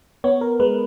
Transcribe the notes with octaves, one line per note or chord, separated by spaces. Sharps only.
B3 C#5
A#4
G#3 B4